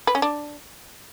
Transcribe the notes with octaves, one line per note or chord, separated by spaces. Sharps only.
B4
C#4
D4